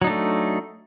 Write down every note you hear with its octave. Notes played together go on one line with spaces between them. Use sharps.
F#3 A3 D4 D#4